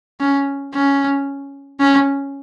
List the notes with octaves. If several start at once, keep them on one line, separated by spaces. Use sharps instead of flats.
C#4
C#4
C#4